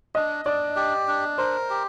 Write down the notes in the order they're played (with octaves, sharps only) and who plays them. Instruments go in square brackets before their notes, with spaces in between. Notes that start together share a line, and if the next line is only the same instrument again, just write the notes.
[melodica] D4 [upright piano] D#5
[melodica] D4 [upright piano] D5
[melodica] G4
D4
[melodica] A#4 [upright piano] C5
[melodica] G4